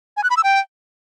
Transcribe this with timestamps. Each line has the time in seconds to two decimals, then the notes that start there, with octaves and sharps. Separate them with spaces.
0.17 G#5
0.24 F#6
0.30 B5
0.37 E6
0.44 G5